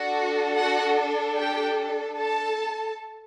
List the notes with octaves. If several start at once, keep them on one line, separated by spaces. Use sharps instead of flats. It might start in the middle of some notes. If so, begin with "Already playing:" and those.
Already playing: D4 F#4 A4
F#4 F#5
G4 G5
A4 A5